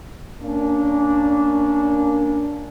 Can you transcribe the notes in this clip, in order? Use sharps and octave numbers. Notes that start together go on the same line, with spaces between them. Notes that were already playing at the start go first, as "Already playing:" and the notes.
A#3 C#4 D4